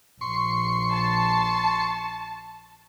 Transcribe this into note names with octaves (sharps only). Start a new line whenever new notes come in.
A#1 C6 C#6
A5